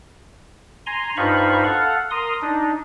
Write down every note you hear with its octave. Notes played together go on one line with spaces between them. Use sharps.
G#5 A#5 C6
G2 D#4 F4 C5 B5 C#6
A4 F5 F#5
A#4 C6 D#6
D4 D#4